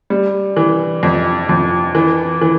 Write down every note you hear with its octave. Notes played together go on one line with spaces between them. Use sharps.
G3
E3
F2
F2
E3
E3